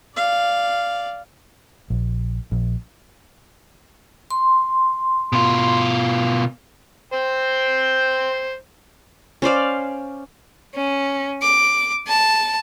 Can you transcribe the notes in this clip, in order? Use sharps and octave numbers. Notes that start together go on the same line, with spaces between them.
D5 F5
A#1
A#1
C6
B2 F4
C5 G5
C#4 C5 D5 F5
C#4
D6
A5